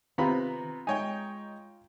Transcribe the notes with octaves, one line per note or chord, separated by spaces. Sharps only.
C3 D#3 B3 C4 F4 A#5 B5
G#3 D#4 C#5 G5 G#5